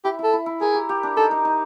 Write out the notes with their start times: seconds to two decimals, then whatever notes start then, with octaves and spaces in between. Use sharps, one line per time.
0.04 E4 G4
0.19 E4 A4
0.33 E4
0.46 E4
0.61 G#4 A#4
0.74 G4
0.89 G4
1.03 D4
1.17 D#4 A4
1.31 D#4
1.45 D#4